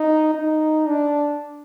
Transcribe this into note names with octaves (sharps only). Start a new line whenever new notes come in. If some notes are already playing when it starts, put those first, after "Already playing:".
Already playing: D#4
D#4
D4